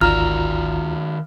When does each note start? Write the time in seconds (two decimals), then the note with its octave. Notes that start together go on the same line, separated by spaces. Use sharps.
0.01 G#1 D2 D#3 F4 F#4 D5 A#5 F6